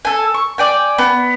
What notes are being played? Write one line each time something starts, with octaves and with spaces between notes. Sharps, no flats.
A4 G#5
C#6
D5 G5 G#5
B3